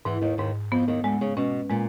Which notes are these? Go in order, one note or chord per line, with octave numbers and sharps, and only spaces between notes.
E2 G#2 E3
D#2 D#3
D#2 G#2 D#3
F2 F3 B3
D#2 D#3
D2 D3 G#3
C#3
B2 C#4
A#2 G#3